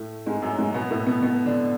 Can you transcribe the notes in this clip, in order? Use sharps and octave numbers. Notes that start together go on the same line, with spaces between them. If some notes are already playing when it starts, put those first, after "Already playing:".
Already playing: A2 A3
G#2 G#3
F#2 F#3
G#2 G#3
B2 B3
A2 A3
B2 B3
B2 B3
D3 D4